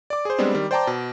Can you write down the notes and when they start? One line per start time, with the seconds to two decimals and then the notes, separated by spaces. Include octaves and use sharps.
0.10 D5 D6
0.25 G#4 C5
0.38 G3 G#3 B3 C4 D4
0.55 D#3 G3
0.71 C5 D5 G5 A5 A#5 D6
0.87 B2